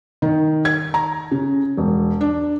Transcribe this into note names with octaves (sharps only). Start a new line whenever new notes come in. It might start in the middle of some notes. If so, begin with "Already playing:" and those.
D#3
G#6
A#5
C#3
E1
D4